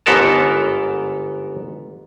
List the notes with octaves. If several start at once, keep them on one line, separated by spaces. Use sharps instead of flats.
G1 G#2 B3 A4 A#4 A5